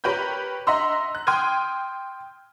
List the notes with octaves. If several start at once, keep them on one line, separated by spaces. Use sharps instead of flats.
G4 A#4 B4 C#5 B5 G6
D#5 E5 F#5 A#5 C6 E6
F#6
G5 C6 D#6 F6 G#6 D#7